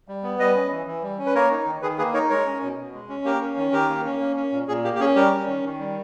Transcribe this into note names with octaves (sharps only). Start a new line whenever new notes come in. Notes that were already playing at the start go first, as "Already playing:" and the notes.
G3
B3
G3 B4 D#5
C#4
E3
E3
G3
C#4
B4
A#3 A#4 C#5
D#4
D#3
D#3 G#4 B4
A#3 G#4 B4
D#4 A#4 C#5
G#3 A#4 C#5
C#4
B2
B2
G#3
C#4
A#3 G4 A#4
C#4
D#3
D#3 G4 A#4
A#3
C#4
A#3
C#4
A#2
A#2 G#4
A#3 G4
G4
C#4 G#4
G3 G4 A#4
C#4
D#3
D#3
G3